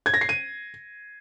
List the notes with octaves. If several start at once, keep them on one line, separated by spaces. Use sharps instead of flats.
G#6
A#6
C7
D#7